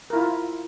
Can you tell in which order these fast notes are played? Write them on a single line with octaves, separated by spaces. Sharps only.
A#4 E4 F4